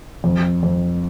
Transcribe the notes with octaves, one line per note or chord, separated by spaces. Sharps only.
F2
F2